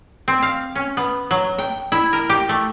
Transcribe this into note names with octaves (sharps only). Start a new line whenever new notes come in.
C4
F5
C#4
B3
F#3
G5
E4
A#4
G4
A3